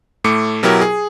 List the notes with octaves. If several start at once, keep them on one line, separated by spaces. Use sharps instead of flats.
A2 A3 D6 C#7
B2 F#3 E4 G4 A#4
G#4